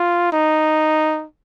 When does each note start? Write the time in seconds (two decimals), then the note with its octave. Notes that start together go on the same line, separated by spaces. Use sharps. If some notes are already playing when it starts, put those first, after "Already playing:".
Already playing: F4
0.32 D#4